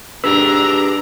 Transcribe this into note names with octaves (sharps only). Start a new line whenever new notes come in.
D4 G4 G#4 B4 A#5 E6